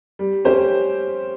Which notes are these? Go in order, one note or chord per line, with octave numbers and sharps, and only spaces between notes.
G3
C#4 G4 C5